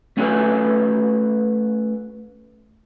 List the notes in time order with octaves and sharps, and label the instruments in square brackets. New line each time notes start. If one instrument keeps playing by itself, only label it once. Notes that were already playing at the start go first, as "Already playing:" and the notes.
[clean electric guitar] A3 C#4 F#4 A4 B4 G#5